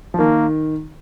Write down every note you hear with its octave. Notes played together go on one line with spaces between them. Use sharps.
F3
D#3 A#3